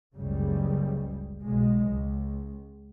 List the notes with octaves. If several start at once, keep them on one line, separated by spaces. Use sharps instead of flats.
F#1 C#2 C#3 G3
B1 G#3
C#2